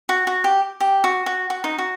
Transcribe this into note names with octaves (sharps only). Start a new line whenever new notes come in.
F#4
F#4
G4
G4
F#4
F#4
F#4
D#4
F#4